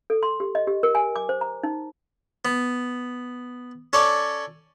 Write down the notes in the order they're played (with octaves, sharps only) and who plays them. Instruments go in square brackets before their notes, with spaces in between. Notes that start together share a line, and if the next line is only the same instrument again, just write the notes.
[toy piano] A4
C6
G4
D#5
G4
A#4
G#5
D6
C5
A#5
D#4
[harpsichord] B3
C#4 A4 C#5 D5